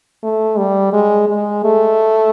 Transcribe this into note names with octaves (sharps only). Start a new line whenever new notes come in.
A3
G3
G#3
G#3
A3